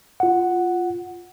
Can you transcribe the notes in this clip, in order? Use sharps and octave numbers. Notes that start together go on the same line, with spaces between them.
F4 F#5